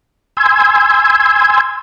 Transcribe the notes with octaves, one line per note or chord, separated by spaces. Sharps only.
G#5 C6 E6 G#6